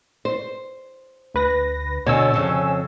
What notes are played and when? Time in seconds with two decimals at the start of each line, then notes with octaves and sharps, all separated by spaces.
0.25 C5
1.34 D2 B4 A#6
2.06 B2 D3 C#5 G#5 E6
2.34 F2 C#3